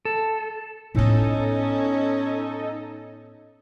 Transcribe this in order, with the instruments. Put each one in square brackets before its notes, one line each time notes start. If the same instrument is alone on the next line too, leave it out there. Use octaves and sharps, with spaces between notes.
[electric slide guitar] A4
[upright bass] A2 B3 [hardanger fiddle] C#4 [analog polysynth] D#4 A4 D#5